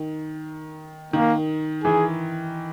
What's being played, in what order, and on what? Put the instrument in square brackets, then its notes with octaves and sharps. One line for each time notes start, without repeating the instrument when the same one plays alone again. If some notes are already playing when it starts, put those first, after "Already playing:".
Already playing: [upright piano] D#3
[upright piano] D#3 [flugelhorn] A#3
[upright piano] E3 [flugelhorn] G#4